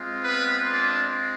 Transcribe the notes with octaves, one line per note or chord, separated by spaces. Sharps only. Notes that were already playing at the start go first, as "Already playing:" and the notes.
Already playing: G#3 C4 F4
B3 B4
D4 D5